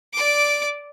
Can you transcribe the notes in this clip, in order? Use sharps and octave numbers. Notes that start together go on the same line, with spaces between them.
D5 D6